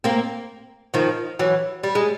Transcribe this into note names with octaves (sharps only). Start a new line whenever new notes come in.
A#3 C4
D#3 F3
E3 F#3
G3
G#3